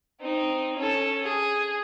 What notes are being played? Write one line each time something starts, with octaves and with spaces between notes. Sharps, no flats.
C4 D#4
C#4 A4
G#4